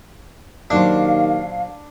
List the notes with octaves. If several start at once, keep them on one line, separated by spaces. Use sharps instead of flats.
D#2 A#2 F#3 D4 C5 F5